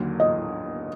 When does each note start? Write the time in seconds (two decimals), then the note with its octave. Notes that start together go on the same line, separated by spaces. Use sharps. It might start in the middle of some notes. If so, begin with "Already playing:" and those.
Already playing: D#2 D3 F#3 A#3 D#4
0.20 D#5